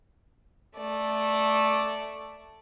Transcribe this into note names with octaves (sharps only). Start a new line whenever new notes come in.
A3 D5